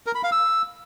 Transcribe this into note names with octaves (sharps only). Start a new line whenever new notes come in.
A#4
B5
F5
E6